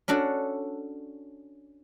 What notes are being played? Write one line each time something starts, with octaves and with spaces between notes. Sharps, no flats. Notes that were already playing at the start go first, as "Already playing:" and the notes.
C#4 D4 F#4 A4